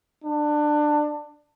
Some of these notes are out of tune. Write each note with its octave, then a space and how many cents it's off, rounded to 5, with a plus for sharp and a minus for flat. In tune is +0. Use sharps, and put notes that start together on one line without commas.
D4 +20